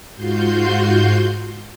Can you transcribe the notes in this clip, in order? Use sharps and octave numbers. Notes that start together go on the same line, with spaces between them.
G#2 F4 F#4 C6 G6